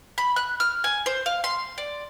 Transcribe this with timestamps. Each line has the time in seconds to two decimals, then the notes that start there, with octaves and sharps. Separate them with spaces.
0.18 B5
0.36 F#6
0.60 F6
0.84 G#5
1.06 C5
1.26 F5
1.44 C6
1.78 D5